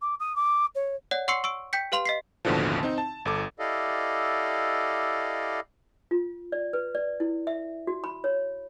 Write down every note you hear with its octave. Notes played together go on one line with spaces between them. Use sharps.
D6
D#6
D6
C#5
C#5 D5 F#5
F#5 C6 C#6 E6 C7 C#7
C#6 E6 D7
G5 G6 B6 C#7
G4 B4 F5 C6 F7 F#7
D#5 B6 C7
A1 D#2 B2 D3 E3 F3
C4 D#4
A5
G1 A4 D6
E4 G4 A4 D5 D#5 F5
F4
D5
B4
D5
E4
E5
F#4
B5
C#5